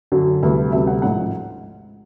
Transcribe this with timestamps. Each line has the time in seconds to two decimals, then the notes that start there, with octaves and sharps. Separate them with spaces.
0.12 F#2 D3 F#3
0.42 D2 C3 E3 G3
0.72 D2 C3 E3 G3 E5
0.87 F#5
1.02 A1 G#2 F3 G#3 F#5